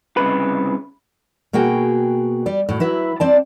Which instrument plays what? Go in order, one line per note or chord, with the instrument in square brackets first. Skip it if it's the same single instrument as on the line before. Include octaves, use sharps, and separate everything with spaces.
[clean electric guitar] C2 F#2 C#3 B4
[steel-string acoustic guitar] B2 A#3 F#4 G#4 G5
G3 D5
A2 F#3
F#3 E4 B4
C4 D5 A5